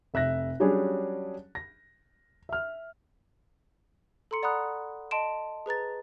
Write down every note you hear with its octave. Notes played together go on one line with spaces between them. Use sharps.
F1 E5 F#6 A#6
F#3 G3 C#4 D4 G#4 C#5
A#6
E5 F6
A4 A#5 C6 C#7
D5 F#5 A#5 B5 D#6 F#6
D#5 A5 C6 D7 E7
G#4 B4 A#5 A6